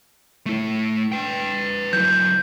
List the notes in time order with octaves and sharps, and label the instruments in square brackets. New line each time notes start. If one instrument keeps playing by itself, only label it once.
[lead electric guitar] A3 E4
B4 G5
[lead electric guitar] F#3 E4 [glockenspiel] G6